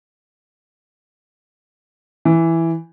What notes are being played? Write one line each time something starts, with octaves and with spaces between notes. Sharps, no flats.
E3